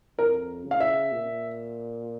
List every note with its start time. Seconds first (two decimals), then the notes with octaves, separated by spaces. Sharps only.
0.18 F2 A#4
0.64 C#3
0.71 F5
0.80 E5
1.12 A#2